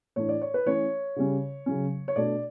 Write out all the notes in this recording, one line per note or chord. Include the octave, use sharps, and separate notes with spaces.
A2 E3 A3 D4 C#5
D5
C#5
B4
E3 A3 C#4 C#5
C#3 G3 C#4
C#3 F#3 C#4
C#5
B2 A3 D4 D5